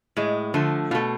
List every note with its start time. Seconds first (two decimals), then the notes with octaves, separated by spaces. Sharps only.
0.17 A2 G#3
0.54 D3 F3 A3
0.91 B2 F4
0.95 A3